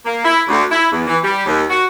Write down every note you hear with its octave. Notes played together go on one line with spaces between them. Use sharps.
A#3
E4
D2
E4
E2
E3
G3
D#2
F#4